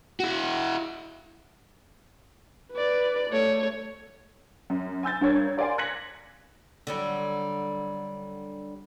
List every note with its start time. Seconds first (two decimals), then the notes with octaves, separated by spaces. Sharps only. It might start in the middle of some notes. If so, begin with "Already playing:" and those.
0.20 E4 F#4
2.73 B4 D5
3.30 A3 C#5
4.70 F#2
5.03 G#5 E6 G6 A6
5.21 G2 D4 A#4 C#5 G#6
5.57 A#4 D5 F5 G#5 C6
5.78 F#6 G#6 A#6 B6 C#7 F#7
6.87 D3 F#3 G3